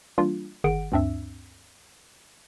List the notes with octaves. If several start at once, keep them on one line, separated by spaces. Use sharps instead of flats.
E3 G3 A#3 D4 F4
G1 D#3 G#4 F#5 D7
D2 G2 C4 D4 E5 E6